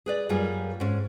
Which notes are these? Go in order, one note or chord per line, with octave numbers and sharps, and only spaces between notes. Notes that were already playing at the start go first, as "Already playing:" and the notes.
G#4 B4 D5
F#2 G3 A#3 F4 G#4
G#2 C#4